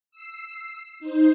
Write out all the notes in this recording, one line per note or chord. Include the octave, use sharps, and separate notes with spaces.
E6 C7
D#4 C5